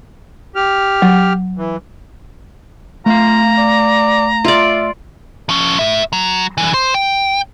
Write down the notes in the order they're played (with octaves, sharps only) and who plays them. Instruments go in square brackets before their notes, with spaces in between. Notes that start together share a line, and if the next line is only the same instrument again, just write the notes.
[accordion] G4 F6
[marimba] F#3
[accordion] E3
[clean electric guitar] A3 F5 [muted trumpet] F4 [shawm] A#5
[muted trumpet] D5
[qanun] F4 D5 [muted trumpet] E5
[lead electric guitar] F3 C#4
A2 E5
F#3
D3 E3
C5
G5